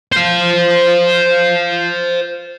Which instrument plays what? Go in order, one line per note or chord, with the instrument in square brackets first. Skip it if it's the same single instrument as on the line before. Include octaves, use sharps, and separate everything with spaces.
[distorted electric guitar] C5 F5